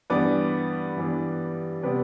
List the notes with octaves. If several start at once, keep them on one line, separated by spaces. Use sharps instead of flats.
G2 E3 G3 B3 B4 D5
G2 E3 G3 B3
C3 G3 B3 B4 D5